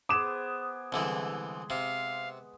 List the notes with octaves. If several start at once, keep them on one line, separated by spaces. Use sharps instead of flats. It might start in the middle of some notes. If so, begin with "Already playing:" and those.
B3 G#4 C5 D6 E7
C2 D3 E3 G#3
C3 F5